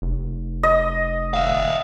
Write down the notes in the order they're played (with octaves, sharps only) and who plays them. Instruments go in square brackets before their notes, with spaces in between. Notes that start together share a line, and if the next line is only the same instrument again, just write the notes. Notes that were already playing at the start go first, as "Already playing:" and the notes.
[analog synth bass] F1
[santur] D#5
[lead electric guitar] E5 F5